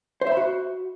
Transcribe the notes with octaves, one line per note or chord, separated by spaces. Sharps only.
C5
E5
B5
F#4